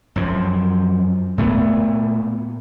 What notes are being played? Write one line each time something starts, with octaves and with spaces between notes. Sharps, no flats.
F#2 F3
A#2 A3 B3